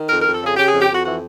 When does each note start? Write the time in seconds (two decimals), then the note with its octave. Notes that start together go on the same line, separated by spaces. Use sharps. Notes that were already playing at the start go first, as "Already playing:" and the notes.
Already playing: D#3
0.09 F2 A#4
0.21 F2 A#4
0.33 A4
0.41 C#3 G#4
0.57 C#3 G4
0.68 F2 G#4
0.80 G4
0.89 F2 F#4
1.05 E3 F#4